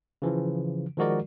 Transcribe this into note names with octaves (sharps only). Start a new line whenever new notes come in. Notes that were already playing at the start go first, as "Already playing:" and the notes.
C#3 E3 F3
D#3 F3 G#3 F#4 A#4 D5